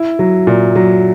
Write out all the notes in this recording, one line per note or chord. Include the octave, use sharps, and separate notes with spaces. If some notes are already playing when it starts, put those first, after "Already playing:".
Already playing: E4
F#3
A#2
F#3